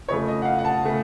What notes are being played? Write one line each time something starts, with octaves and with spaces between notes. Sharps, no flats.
F2 C#3 A3 C#5
D#5
F#5
F5
F#5
A5
C#3 A3